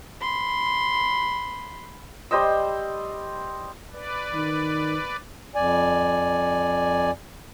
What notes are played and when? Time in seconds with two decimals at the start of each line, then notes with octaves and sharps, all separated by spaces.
0.20 B5 C6
2.31 G3 C5 D#5 E6
3.93 B4 D5
4.34 D#3
5.55 F2 D5 G#5